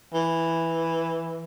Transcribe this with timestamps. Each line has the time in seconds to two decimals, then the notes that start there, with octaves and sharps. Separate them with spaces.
0.14 E3